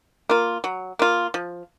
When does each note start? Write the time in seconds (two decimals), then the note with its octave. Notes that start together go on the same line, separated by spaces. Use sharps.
0.29 A#3 F4
0.64 F#3
0.99 A#3 F4
1.34 F3